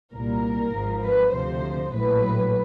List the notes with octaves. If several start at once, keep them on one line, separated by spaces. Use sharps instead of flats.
C2 A#2 G3 A#4
G#1 G#2 F3
B4
D2 C3 F3 C5
A#1 A2 F#3 B4